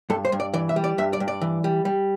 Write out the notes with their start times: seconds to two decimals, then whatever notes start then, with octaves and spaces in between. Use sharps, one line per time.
0.10 G2 A4
0.25 C5
0.32 G2
0.40 D5
0.54 E3 D5
0.69 E5
0.76 G3
0.84 D5
0.98 G2 E5
1.13 D5
1.20 G2
1.28 D5
1.41 E3
1.64 G3
1.85 G3